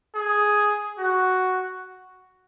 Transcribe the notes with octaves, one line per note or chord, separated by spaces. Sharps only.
G#4
F#4